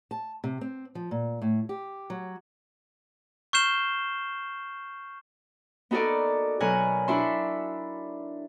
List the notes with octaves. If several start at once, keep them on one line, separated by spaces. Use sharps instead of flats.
A5
C3
C4
F3
A#2
A2
G4
F#3
C#6 F6 G6 C7 E7 G7
B3 D#4 F#4 A4 A#4 D5
B2 F#3 A#4 C#5 G#5 F#6
D4 E4 F#4 E5 C6